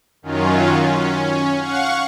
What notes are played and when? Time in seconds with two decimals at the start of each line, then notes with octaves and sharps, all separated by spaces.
0.22 F#2 D#3 F#3 C#4 F4
0.80 C#4
1.58 F5 F#5 C#6